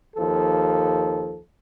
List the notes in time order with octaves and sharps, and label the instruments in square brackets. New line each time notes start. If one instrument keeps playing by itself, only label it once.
[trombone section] D#2 F3 A4